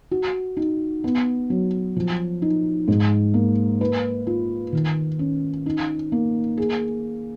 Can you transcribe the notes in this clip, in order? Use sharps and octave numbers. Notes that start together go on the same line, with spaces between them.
F#4
D#4
B3
F#3
F3
D#4
G#2
A#3
B4
F4
D#3
C#4
D#4
A#3
G#4